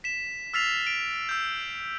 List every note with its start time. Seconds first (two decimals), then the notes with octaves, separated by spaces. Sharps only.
0.04 B6 E7
0.54 E6 F6 A6 B6 C7 F7
0.87 D7
1.29 E6 G6